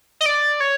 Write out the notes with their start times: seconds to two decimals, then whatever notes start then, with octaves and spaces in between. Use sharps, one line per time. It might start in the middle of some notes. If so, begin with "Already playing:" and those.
0.21 D#5
0.26 D5
0.60 C#5